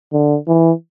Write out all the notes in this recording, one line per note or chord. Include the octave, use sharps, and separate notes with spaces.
D3
E3